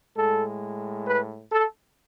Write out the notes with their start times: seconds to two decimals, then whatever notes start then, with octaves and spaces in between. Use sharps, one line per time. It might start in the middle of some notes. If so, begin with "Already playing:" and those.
0.16 A2 G#3 A4
1.07 B4
1.52 A4